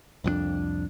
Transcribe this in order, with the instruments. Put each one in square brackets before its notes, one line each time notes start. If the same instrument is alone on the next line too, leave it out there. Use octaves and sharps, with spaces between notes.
[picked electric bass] C2 F2 G#3 D4